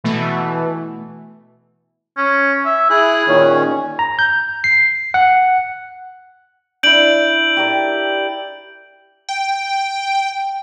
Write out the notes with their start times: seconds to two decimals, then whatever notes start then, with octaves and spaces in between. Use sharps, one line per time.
0.04 B2 E3 A3
2.17 C#4
2.65 E5
2.90 E4 G#4 F#6
3.27 A#2 D#3 C#4
3.99 A#5
4.19 G6
4.64 C7
5.14 F#5
6.83 D4 E4 G6 D7 F#7
7.57 G4 A#4 D5
9.29 G5